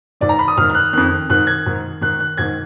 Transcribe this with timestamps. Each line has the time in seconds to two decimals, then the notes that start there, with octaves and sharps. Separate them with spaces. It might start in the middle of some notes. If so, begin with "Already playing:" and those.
0.21 G#2 D#3 D5
0.29 A#5
0.39 B5
0.48 D#6
0.57 G#2 D#3 F6
0.70 F6
0.74 F#6
0.93 F2 D#3 F#6
1.29 G#2 D#3 F#6
1.47 G#6
1.66 G#2 D#3
2.01 G#2 D#3 F#6
2.20 F#6
2.37 G#2 D#3 G#6